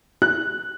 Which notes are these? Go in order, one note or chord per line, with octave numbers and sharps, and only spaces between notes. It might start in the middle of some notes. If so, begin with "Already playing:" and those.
F#6